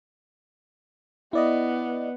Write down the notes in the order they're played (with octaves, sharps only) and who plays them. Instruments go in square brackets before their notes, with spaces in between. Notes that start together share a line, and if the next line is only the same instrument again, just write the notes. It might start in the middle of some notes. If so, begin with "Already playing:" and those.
[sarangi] B3 [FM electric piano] E4 D5 D#5